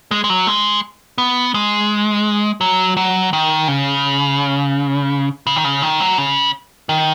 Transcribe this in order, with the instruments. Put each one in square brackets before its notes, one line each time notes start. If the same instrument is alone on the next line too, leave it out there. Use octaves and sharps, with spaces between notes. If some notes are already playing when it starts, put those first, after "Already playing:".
[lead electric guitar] G#3
G#3
F#3
G#3
B3
G#3
F#3
F#3
D#3
C#3
C#3
D#3
C#3
D#3
F#3
C#3
D#3